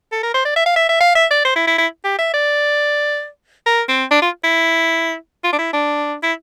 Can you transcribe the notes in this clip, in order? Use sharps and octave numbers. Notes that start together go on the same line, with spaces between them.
A4
A#4
C5
D5
E5
F5
E5
E5
F5
E5
D5
C5
E4
E4
E4
G4
E5
D5
A#4
C4
D4
F4
E4
F4
D4
E4
D4
E4